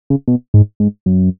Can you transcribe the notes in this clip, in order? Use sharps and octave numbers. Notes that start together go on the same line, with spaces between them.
C#3
B2
G#2
G#2
F#2